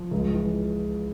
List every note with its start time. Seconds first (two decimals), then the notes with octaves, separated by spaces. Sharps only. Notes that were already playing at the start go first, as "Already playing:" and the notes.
Already playing: F3
0.11 C#2
0.34 E3